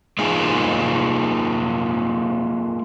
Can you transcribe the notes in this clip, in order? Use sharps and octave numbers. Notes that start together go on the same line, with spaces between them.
G#3 A#3 D#4 F4 G#4